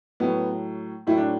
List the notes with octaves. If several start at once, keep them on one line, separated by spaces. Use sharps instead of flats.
A2 F#3 B3
A2 F#3 E4
D4